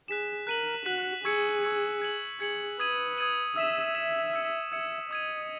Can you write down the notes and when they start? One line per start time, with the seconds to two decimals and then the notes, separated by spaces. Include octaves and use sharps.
0.08 G#4 F#6 B6 E7
0.47 A#4 F#6 B6 D#7 F#7
0.86 F#4 F#6 B6 D#7 F#7
1.24 G#4 C#6 E6 G#6 C#7
1.63 C#6 E6 G#6 C#7
2.02 G#6 C#7 F#7
2.40 G#4 G#6 C#7 F#7
2.79 B4 D#6 G#6 D#7 F#7
3.18 D#6 G#6 D#7 F#7
3.56 E5 E6 B6 E7
3.95 E5 E6 B6 E7
4.33 E6 G#6 C#7
4.72 E5 E6 G#6 C#7
5.10 D#5 D#6 G#6 D#7